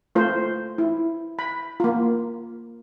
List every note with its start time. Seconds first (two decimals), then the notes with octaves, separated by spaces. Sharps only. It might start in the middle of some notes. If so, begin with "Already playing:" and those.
0.15 A3 F4 C5
0.78 E4
1.39 B5
1.80 A#3 F4